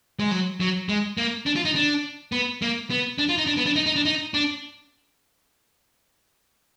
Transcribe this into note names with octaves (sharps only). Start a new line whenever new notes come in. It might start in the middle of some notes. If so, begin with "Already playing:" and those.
G#3
F#3
F#3
G#3
A#3
D4
F4
D#4
D4
B3
A#3
B3
D4
F4
D#4
D4
B3
D4
D#4
D#4
D4
D#4
D4